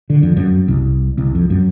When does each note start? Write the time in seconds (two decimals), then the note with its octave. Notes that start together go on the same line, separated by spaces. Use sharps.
0.10 D3
0.23 F2
0.37 F#2
0.68 C2
1.18 C2
1.35 F2
1.50 F#2